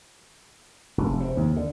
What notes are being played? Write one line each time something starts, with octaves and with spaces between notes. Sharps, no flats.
F1
C3
D#2
D3